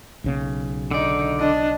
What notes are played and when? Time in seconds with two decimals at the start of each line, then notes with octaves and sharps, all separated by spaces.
0.24 B1 C#3 A#3
0.91 D3 D#4 D5
1.39 D4 D#5